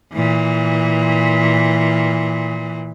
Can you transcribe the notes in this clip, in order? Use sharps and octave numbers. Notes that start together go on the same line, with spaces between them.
A#2 E3